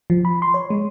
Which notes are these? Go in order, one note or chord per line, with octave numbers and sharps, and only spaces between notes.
F3
B5
C6
C#5
G#3